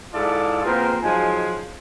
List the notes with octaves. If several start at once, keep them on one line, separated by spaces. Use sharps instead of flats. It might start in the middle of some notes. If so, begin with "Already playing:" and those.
G#2 E4 F4 A4 D5 A5
A#2 B3 C4 G#4 A#4
F3 F#3 G#3 D#4 G#5